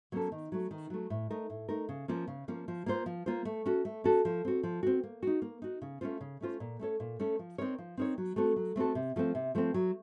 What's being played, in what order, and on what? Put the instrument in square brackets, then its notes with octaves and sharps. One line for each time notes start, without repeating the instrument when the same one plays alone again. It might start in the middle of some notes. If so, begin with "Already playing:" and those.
[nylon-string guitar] F#3 A#3 C#4 A4
D#3
F#3 A3
D#3
F#3 A3
A2
A3 D#4 A#4
A2
A3 D#4 A#4
C#3
F3 A#3 C#4
C#3
F3 A#3 C#4
F3
A#3 F4 C5
F3
A#3 F4 C5
A3
C#4 F#4 A4
A3
C#4 F#4 A4
F3
C4 F#4
F3
C4 F#4
A#3
D#4 F#4
A#3
D#4 F#4
C#3
A3 C#4 F4 C5
C#3
A3 C#4 F4 C5
A#2
A3 C#4 A4 C#5
A#2
A3 C#4 A4 C#5
F3
C4 D#4 A#4 C#5
F3
C4 D#4 A#4 C#5
F#3
A3 C4 F#4 A4
F#3
A3 C4 F#4 A4
C3
F3 A3 C4
C3
F3 A3 C4
F#3